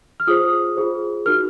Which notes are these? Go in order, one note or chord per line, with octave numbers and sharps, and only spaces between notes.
F6
F4 G#4 C5 D#6
F4 G#4 C5
D#4 F#4 A#4 F6